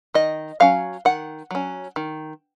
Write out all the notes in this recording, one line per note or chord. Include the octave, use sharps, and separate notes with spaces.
D#3 D#5
F#3 C#4 F5
D#3 F#5
F#3 C#4
D#3